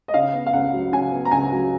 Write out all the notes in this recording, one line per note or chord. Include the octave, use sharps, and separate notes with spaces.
D#5
C#3 F5
B3
F5
C#2 F#5
F#3
C#3 G#5
B3
A#5
C#2 G#5
F#3